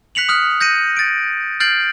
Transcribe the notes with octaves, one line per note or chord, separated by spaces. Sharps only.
F#6 B6 C#7 F7 F#7
D#6 F6 F#6
G6 A#6 C#7 D#7
A6 D7
F6 G6 A6 C7 D7 F#7